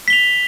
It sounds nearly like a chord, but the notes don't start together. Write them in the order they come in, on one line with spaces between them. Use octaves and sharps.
B6 G7 F7